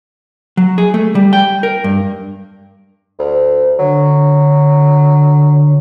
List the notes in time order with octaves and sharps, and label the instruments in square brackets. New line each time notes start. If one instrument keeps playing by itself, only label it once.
[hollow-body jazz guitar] F#3
G#4
A3
G3
G5
A#4
G2
[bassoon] D2
[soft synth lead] D3 [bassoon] F#3